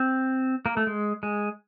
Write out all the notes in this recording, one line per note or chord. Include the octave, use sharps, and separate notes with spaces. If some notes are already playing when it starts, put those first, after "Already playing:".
Already playing: C4
A#3
A3
G#3
G#3